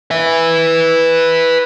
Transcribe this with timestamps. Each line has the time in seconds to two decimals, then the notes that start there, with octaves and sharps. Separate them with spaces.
0.11 B4 E5